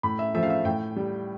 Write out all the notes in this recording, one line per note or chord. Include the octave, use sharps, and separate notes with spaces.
A2 B5
E5
F3 A3 E5
F5
E5
A2 G5
G3